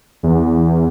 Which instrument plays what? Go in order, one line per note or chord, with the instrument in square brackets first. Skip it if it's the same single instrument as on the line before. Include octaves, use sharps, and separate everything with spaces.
[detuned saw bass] E2